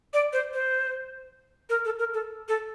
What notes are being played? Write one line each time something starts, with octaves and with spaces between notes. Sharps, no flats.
D5
C5
C5
A#4
A4
A#4
A4
A4